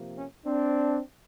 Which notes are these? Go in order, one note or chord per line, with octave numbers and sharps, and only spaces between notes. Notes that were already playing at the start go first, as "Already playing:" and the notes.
Already playing: C3 F3 A#3
C#4
C4 D4